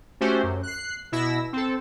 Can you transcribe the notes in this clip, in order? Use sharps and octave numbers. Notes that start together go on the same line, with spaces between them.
A3 C#4 F#4 G4 C5
F#2
F#6 C7
B2 E4 E6 A#6
C4 A4